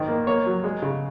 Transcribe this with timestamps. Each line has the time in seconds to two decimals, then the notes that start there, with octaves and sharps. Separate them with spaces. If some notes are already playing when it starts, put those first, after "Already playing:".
Already playing: G#2 D#3
0.08 A#3
0.27 A#3 C#5
0.46 F#3
0.64 G#3
0.82 C#3